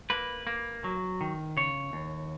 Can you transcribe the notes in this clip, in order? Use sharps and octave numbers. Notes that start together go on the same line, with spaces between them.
A#3 B4
A#3
F#3
D#3
C#3 C#5
D#2